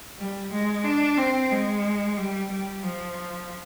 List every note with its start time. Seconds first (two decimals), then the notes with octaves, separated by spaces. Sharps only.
0.19 G3
0.52 G#3
0.84 D4
1.17 C4
1.51 G#3
2.17 G3
2.51 G3
2.83 F3